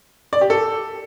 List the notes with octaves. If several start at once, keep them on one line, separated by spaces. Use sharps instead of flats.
D5
G4
A4